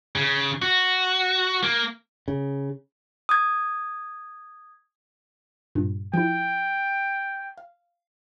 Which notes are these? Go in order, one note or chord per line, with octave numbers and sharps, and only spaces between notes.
C#3
F#4
A#3
C#3
D#6 G#6
G2 A#2
F3 E4 G5
F5